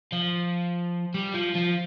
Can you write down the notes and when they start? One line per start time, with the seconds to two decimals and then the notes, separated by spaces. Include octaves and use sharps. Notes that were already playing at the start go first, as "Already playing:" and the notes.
0.12 F3
1.14 G3
1.34 F3
1.55 F3